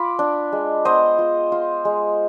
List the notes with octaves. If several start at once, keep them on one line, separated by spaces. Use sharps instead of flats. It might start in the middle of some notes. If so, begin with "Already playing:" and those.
Already playing: F4 B5 D6
D4
G#3
B3 C5 D#5
F4
F4
G#3